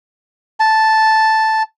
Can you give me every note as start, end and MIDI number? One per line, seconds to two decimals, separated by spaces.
0.60 1.63 81